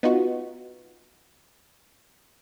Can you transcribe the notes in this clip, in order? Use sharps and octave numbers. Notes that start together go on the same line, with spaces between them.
B3 D#4 F4 F#4